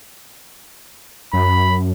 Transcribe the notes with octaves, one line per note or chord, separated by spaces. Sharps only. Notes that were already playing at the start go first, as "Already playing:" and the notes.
F#2 B5